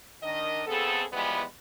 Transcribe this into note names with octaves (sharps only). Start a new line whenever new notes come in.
D#3 D4 D#5
C#3 B3 C4 G#4 A4
E3 F3 G3 G#3 B3